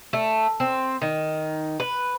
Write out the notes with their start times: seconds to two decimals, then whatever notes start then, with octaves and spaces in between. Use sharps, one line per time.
0.13 A3
0.60 C4
1.02 D#3
1.80 B4